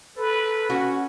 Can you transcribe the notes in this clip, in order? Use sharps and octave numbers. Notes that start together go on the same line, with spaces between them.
A4 B4
C#4 F#4